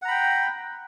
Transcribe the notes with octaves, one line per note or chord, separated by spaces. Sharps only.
F#5 G5 A#5 B5